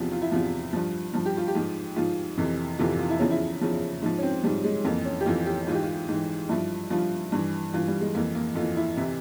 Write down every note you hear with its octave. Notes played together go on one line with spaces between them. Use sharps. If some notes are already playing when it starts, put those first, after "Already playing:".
Already playing: E2 C3 F3
F4
E4
E2 C3 F3 F4
G2 F3
G2 F3
G4
F4
G4
G#2 F3
G#2 F3 F4
F2 C3 E3
F2 C3 E3 F4
F4
E4
E2 C#3 F3 C#4
E4
E2 C#3 F3
G#2 F3
C#4
C4
G#2 F3 G3
G#3
F2 E3 A#3
C#4
G4
F2 E3 F4
G4
G#2 E3 F4
G4
F4
G#2 E3
G2 F3 E4
G2 F3 F4
G2 E3
G2 E3 F4
G3
G#3
F2 E3 A#3
A#3
F2 E3 F4
E4
C3 E3 E4